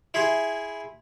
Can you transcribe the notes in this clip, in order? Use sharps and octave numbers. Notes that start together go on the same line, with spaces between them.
E4 G#4 C6